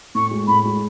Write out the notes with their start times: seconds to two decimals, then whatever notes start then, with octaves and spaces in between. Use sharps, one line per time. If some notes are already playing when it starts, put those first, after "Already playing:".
0.15 A2 C#6
0.31 G#3
0.48 A2 B5
0.65 G#3